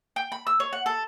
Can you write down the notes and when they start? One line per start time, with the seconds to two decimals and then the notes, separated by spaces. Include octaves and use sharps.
0.16 G5
0.32 B5
0.47 E6
0.60 C#5
0.73 F#5
0.86 A4